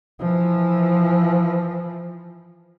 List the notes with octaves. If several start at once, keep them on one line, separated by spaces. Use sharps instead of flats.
E3 F3